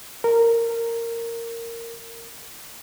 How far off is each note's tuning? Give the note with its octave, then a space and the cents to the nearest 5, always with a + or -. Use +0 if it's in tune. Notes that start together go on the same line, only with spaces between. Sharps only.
A#4 -15